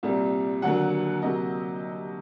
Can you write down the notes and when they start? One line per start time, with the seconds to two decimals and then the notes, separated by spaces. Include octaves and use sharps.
0.03 C2 A#2 G3 C4
0.62 D#2 D3 F#3 A#3 F#5
1.22 C3 F#3 A#3 D#5